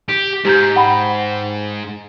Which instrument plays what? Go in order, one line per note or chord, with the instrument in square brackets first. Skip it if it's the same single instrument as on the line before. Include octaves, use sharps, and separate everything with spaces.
[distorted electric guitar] G4
[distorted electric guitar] G#2 [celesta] G4 A#5 G6
[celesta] F#5 G5 B5